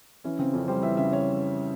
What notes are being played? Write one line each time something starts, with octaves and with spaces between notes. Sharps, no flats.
E3 C#4
C#3 C4
F2 C#4
G3 C5
E3 E5
C#3 E5
C#5